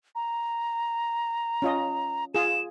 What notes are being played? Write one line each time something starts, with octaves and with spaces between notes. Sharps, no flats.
A#5
C#4 F4 D#5
F4 G#4 E7